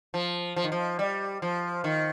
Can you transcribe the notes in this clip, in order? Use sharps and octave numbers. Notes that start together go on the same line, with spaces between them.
F3
F3
D#3
F3
G3
F3
D#3